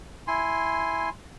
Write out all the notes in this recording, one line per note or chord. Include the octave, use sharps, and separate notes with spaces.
E4 G#5 C6